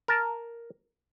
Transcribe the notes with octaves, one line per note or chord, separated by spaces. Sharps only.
A#4 A5